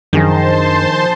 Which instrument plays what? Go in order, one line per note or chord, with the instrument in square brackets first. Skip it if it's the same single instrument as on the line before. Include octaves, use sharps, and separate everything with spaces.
[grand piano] A#1 G#4 A#6 [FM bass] F#2 [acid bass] D#3 [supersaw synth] C5 A5 C6